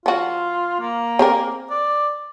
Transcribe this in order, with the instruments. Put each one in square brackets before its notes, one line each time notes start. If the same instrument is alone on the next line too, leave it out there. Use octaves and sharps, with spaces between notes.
[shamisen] F3 F#4 [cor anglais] F4
[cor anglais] A#3
[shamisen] C4 G#4 A#4
[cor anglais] D5